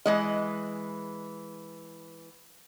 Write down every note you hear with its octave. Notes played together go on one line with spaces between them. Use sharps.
E3 G#3 D#5